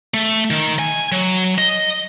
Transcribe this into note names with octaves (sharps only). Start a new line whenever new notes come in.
A3
D#3
G#5
F#3
D#5